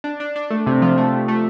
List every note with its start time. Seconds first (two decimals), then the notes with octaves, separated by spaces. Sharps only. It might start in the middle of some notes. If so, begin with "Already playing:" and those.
0.04 D4
0.20 D4
0.36 D4
0.50 A3
0.66 C3
0.82 F3
0.98 A3
1.13 C3
1.28 A3